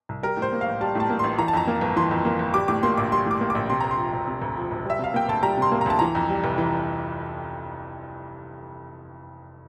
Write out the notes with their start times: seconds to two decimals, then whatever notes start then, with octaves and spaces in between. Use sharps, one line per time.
0.09 C2
0.23 G3 A#4
0.37 A2
0.42 C5
0.52 A#3
0.61 F5
0.66 A1
0.81 G3 A5
0.95 A2 A5
1.10 A#3
1.19 A1 C6
1.38 E3 A#5
1.48 A5
1.53 F2 A#5
1.67 A#3
1.81 G1
1.96 E3 C6
2.11 F2
2.25 A#3
2.39 G1
2.54 G3 D6
2.68 A2 D6
2.83 A#3 C6
2.97 A#1 D6
3.12 G3 C6
3.26 A2 D6
3.41 A#3
3.50 A#1 D6
3.70 C3 C6
3.81 D2 A#5
3.91 C6
3.98 F3
4.13 E1
4.27 C3
4.42 D2
4.57 F3
4.71 E1
4.85 G3 E5
4.99 C3 F5
5.14 A#3 G5
5.28 D2 A5
5.43 G3 A#5
5.57 C3 C6
5.72 A#3
5.81 A#5
5.86 D2 A5
5.99 E3 A#5
6.15 F2
6.30 G3
6.44 F1
6.58 E3